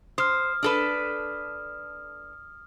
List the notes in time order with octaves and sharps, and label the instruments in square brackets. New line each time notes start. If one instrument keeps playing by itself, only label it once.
[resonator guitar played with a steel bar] C5 [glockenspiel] D#6 F6
[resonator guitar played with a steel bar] D4 A4 B4